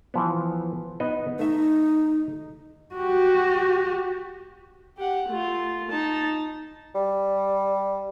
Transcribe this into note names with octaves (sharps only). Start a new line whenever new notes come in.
E3 F3 B3
B3 D#4 D#5
A3 D#4 E5
F#4 G4
G4 F#5
A3 F4
D#4 A5
G3